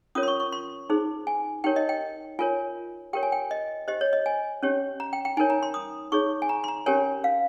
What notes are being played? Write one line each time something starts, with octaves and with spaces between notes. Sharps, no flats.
C#4 F4 A#4 C#5 D#6
C6
C#6
C#6
C6
D#4 G#4 C5
G#5
D#4 G4 A#4 C#5 G5
D#5
G5
F4 A#4 C#5 G#5
G4 A#4 C#5 G5
G#5
G5
D#5
G4 C5 D#5
C#5
D#5
G#5
C#4 G4 C#5
A#5
G5
G5
D#4 A#4 C#5 G#5
A#5
C6
D#6
D#4 G#4 C#5 C#6
G#5
A#5
C6
A#5
C#4 G4 A#4 C#5 G#5
F5